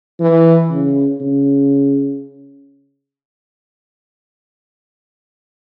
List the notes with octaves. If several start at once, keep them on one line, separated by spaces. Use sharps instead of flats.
E3
C#3
C#3